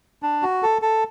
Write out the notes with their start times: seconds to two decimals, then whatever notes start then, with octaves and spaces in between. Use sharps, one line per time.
0.23 D4
0.43 F#4
0.63 A4
0.82 A4